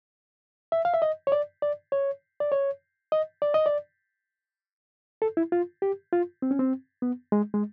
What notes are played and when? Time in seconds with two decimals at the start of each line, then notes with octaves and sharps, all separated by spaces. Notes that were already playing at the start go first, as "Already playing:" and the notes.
0.72 E5
0.85 F5
0.94 E5
1.02 D#5
1.27 C#5
1.32 D5
1.62 D5
1.92 C#5
2.40 D5
2.52 C#5
3.12 D#5
3.42 D5
3.54 D#5
3.66 D5
5.22 A4
5.37 E4
5.52 F4
5.82 G4
6.13 F4
6.42 C4
6.51 C#4
6.59 C4
7.02 B3
7.32 G#3
7.54 G#3